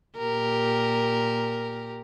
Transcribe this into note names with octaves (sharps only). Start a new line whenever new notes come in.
A#2 G4 A#4